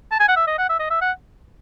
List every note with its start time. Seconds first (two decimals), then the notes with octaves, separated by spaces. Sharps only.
0.12 A5
0.20 G#5
0.28 F#5
0.36 E5
0.47 D#5
0.58 F#5
0.69 E5
0.79 D#5
0.90 E5
1.01 F#5